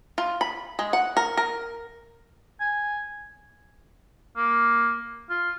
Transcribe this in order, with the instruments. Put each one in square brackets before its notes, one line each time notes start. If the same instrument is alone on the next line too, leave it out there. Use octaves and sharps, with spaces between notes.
[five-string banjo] F4
B5
G#3
F#5
A#4
A#4
[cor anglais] G#5
A#3
F4